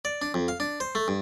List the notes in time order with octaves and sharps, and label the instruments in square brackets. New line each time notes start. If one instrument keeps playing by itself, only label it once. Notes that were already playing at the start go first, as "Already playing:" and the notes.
[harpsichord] D5
D4
F2
F5
D4
C5
A3
G2